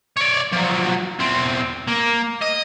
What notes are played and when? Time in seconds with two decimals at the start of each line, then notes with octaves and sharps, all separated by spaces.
0.17 C#5 D5
0.52 F3 F#3
1.19 E2 C4
1.88 A#3
2.42 D#5